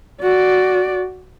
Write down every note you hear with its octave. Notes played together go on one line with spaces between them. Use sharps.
F#4 D5